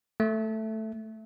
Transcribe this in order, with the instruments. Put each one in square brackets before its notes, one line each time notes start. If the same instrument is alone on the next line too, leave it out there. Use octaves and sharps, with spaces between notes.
[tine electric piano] A3